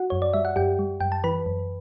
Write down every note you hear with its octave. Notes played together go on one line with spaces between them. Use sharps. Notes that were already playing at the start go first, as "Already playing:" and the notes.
Already playing: F#4 F#5
F#2 C#5
D5
G3 E5
F#5
F#2 G4 G5
G3
F#2 G5
A5
E3 B4 B5
F#2